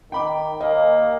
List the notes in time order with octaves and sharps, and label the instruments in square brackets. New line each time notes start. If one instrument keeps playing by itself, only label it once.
[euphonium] D#3 [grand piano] G5 B5 D6
[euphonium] D#2 [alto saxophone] A#3 [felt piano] D#5